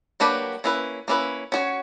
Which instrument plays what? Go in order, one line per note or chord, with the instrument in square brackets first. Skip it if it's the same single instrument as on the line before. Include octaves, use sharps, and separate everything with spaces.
[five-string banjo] F#3 A#3 D4 G4 B4
A#3 C#4 E4 B4
A#3 C#4 E4 B4
C#4 F#4 C#5